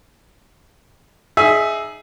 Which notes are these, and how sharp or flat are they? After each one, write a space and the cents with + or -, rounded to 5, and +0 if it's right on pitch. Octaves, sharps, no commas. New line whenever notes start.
D#4 -15 G#4 +15 E5 +0